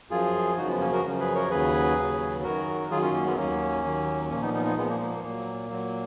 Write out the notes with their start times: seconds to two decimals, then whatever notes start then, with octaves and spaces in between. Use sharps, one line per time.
0.10 F#2 F3 F4 G#4
0.57 F#2 C#3 F3 D#4 F#4
0.69 G#3 B3
0.80 A#3 C#4
0.92 F#4 A#4
1.04 F#2 C#3 F3
1.19 G#4 B4
1.35 A#4 C#5
1.50 D#2 C#3 F#3 G#4 B4
1.97 D#2 C#3 F#3
2.43 F#2 D#3 F#3 F#4 A#4
2.90 F#2 D#3 F#3 F4 G#4
3.02 C#4 F4
3.13 A#3 C#4
3.25 G#3 B3
3.37 D#2 D#3 F#3 A#3 C#4
3.84 D#2 D#3 F#3
4.30 A#2 F3 A#3 C#4
4.42 B3 D#4
4.53 B3 D#4
4.65 B3 D#4
4.77 A#2 F3 G#3 B3
4.88 A#3
5.00 A#3
5.12 A#3
5.24 A#2 F#3
5.70 A#2 F#3